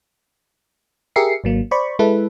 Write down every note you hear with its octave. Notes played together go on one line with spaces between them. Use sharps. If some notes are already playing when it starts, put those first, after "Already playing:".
G4 G#4 A#4 E5 C7 C#7
G#1 F#3 A#3
C5 D5 B5 C#6
G#3 E4 A4 B4